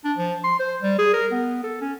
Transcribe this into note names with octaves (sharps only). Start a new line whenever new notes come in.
D4
F3
C6
C5
G3
G#4
A#4
B3
A4
C#4